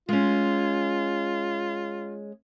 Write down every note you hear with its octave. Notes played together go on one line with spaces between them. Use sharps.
G#3 C#4 F4